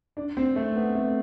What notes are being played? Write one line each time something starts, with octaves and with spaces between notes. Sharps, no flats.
D4
C4
A3
B3
A3